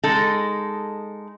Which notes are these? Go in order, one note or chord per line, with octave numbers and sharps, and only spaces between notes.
G#3 D#4 A4